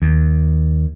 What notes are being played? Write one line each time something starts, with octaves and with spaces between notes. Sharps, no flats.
D#2